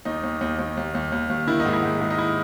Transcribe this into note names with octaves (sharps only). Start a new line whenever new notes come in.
D#2 D#4
D#2
D#2
D#2
D#2
D#2
D#2
D#2
D#3 E4
D#4
G#2
E4
G#2
G#2
D#4
E4